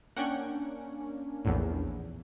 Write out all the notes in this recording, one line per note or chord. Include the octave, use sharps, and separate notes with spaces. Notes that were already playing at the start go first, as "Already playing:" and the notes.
A#3 C#4 D4 F#5 G5 C#6
A#1 E2 A2